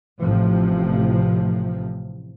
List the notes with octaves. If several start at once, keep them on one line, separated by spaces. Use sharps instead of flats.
A1 A2 C3 F3